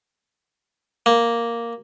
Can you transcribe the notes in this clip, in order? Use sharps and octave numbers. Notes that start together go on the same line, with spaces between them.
A#3